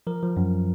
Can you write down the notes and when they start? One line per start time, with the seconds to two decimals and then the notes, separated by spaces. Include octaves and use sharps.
0.07 F3 A#4
0.23 F3
0.37 F#2